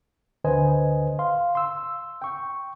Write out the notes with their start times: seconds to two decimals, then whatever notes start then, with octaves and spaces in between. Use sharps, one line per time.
0.44 D2 D3 B4 C5 D#5 G#5
1.19 F5 C6
1.55 C6 E6
2.22 G5 C#6